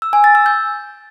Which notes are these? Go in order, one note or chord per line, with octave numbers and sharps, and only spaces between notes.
E6
G#5
A6
E6
G6